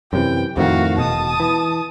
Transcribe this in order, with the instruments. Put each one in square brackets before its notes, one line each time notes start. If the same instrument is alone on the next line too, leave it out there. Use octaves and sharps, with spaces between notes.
[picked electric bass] F#2 C3 E3 [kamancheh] G5
[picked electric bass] F2 A2 D#3 [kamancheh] F#4 F5
[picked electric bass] E1 B2 [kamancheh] A5 D#6
[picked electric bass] E3